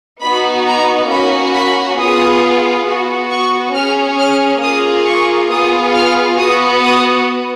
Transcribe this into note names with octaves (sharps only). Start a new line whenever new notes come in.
B3 D#4 F#4 B5
A#5
A#3 C#4 F#4 B5
B5
B3 F4 G#4 D#6
B3 F#4
C#6
C#4 G#4 F6
F6
A#3 F4 G#4 D#6
C#6
B3 F4 G#4 D#6
F6
B3 F#4 D#6
D#6